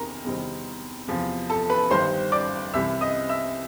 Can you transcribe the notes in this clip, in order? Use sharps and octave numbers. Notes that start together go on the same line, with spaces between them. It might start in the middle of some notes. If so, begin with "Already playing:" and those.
Already playing: E2 C3 D#3 A#4 A#5
E2 C3 D#3 G3 C4
E2 C3 F3
A4 A5
B4 B5
G1 G2 D#3 G3 C5 C6
D5 D6
C2 C3 E3 E5 E6
D#5 D#6
E5 E6